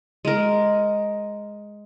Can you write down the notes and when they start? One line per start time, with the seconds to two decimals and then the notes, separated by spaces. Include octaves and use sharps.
0.25 G#3 A#4